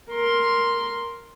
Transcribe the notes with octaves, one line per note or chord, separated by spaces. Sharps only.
A#4 C6